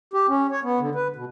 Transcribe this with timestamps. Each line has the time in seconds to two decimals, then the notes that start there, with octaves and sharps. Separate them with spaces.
0.13 G4
0.29 C#4
0.52 C#5
0.63 B3
0.80 D3
0.95 B4
1.16 B2